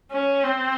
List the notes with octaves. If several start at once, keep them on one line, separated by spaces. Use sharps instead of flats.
C#4
C4